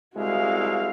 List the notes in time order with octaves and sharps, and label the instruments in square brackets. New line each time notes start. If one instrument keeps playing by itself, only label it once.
[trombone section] C2 G#3 E4 [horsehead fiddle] F#4 F5